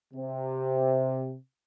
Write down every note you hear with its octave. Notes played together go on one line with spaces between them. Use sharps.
C3